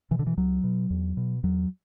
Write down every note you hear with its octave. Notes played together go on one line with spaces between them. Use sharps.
B2 E3
D3
E3
C#2 F#3
B2
E2
B2
E2 F#3